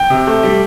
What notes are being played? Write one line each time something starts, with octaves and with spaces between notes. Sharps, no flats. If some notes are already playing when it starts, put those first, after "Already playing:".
Already playing: G5
C3
A3
G3